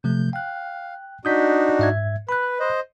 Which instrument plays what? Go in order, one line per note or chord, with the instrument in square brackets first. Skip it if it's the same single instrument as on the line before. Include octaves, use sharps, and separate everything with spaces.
[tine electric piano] C3 F3 A3 [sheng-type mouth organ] G6
[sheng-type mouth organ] F5 [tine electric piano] G5 F#6
[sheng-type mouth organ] D4 D#4 F#4 [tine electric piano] D#6 G6 B6
[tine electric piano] G#2 E5 G#6
[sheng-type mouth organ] B4 [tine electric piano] B5 F#6
[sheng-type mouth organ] C5 D#5